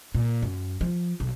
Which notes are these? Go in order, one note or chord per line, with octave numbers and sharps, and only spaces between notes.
A#2
F#2
F3
B1